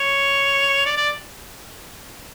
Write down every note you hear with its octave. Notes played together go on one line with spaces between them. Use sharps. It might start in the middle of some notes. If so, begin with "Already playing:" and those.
Already playing: C#5
D5
D5